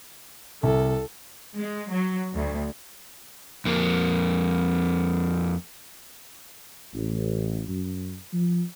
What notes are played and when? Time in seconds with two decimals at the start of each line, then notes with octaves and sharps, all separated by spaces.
0.63 C2 A4
1.58 G#3
1.93 F#3
2.34 D2
3.65 F2 A#3
6.94 A1
7.68 F#2
8.34 F3